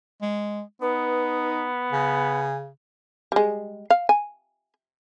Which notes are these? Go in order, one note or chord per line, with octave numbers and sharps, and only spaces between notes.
G#3
B3 D#4 B4
C#3 G#5
G3 G#3
F5
G#5